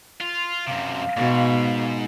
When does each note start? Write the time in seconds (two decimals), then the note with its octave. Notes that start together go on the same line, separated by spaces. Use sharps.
0.21 F4
0.67 F#2 C3 F5
1.17 G#2 B2